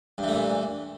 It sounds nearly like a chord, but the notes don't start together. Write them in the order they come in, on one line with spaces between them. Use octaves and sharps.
G2 E3 A3 A#2